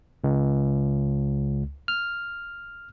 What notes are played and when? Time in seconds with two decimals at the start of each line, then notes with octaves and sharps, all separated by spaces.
0.24 C#2
1.88 F6